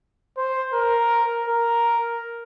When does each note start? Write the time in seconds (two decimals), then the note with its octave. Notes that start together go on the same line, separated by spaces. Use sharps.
0.38 C5
0.74 A#4
1.48 A#4